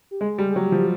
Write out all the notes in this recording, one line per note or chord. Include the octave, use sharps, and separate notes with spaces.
G4
G#3 G#4
G3
G#4
F#3 G4
F3